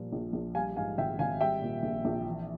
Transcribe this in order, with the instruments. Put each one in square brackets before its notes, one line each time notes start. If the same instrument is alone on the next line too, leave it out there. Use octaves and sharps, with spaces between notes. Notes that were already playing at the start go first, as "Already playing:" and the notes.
Already playing: [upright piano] A#2 F3 G3
A#1
A#1
G3 F5 G#5
G#2 F5 G#5
G#1 E5 G5
G#1 F5 G#5
G3 E5 G5
A#2
A#1
A#1
E3